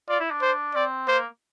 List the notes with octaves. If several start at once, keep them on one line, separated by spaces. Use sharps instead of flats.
F4 D5
E4
D4
C5
C4 D5
A#3 C5